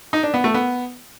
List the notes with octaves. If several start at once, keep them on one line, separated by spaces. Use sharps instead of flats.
D#4
D4
B3
A3
B3